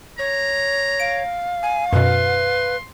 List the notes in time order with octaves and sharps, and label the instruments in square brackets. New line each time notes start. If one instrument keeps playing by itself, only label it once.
[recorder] C#5 [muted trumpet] A#5
[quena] F5 [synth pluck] D7
[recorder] G#5
[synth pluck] F#2 B2 [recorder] B4 [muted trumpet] C6